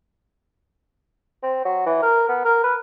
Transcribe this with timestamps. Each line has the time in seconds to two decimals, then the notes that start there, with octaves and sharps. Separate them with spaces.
1.43 C4
1.65 F#3
1.86 E3
2.03 A#4
2.29 B3
2.45 A#4
2.64 B4